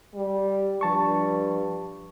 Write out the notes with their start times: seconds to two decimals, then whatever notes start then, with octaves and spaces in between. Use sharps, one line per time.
0.14 G3
0.81 G2 F3 A5 C#6